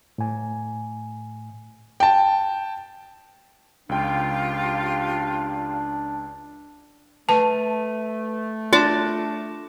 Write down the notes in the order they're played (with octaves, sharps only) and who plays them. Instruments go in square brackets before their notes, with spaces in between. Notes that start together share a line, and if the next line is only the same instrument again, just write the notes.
[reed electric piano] A2 G#5
[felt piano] G5 A5
[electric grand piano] C#2 G5 [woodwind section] D4 [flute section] F4 G4
[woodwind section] A3 [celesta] B4 D#7 [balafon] A5
[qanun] D4 D6 [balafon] F4 [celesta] A#6 E7